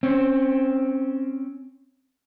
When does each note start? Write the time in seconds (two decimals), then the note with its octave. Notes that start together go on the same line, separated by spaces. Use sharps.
0.03 C4 C#4